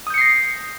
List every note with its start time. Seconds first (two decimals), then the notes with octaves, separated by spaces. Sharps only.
0.07 D#6
0.10 G6
0.14 C#7
0.18 C7
0.21 A#6